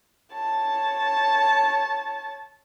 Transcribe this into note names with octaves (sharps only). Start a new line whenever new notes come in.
C#5 A5